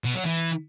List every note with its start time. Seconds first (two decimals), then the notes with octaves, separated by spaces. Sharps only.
0.04 B2
0.15 F#3
0.25 E3